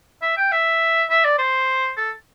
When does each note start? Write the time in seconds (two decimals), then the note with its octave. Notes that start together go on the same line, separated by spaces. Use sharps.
0.22 E5
0.37 G5
0.52 E5
1.10 E5
1.25 D5
1.38 C5
1.97 A4